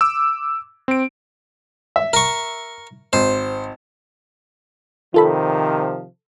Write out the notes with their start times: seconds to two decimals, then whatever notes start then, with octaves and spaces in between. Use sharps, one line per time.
0.01 D6 E6
0.88 C4 D7
1.96 E5
2.13 A#4 C#6
3.13 G#1 C5
5.14 C3 D#3 F3 F4 A4 B5